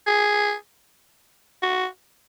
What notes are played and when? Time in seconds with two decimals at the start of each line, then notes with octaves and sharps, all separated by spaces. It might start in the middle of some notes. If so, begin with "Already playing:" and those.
0.07 G#4
1.62 F#4